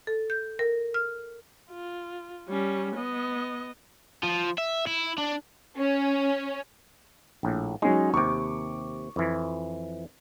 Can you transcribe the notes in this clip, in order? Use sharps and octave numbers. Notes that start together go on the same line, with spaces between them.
A4
G6
A#4
F6
F4
G3 C#4
B3 D#5
F3
E5
E4
D4
C#4
A#1 A2
F#3 G#3 C#4 D#4
D#2 C3 C#6 D6
F2 E3